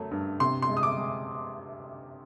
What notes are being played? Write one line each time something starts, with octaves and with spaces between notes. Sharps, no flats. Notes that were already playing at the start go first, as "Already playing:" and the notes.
Already playing: F#2 F#3 A3
G2
C3 C6
C6
G#3
D#6
D6
G#3